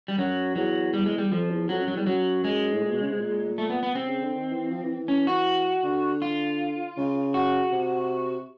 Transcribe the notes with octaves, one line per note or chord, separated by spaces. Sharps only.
G3
F#2 F#3
E2 F#3
G3
G#3
G3
F2 F3
E2
F2 F#3
F#2
F#3
E2 G3
F#2 F#3
G#3
A2
A#2
B2
C#3
C3
A#2
A3
B3
B3
C3 C4
C#3
D3
D#3
E3
F3
E3
E3
C#4
F#4
D3
F4
C#3
F#4
C3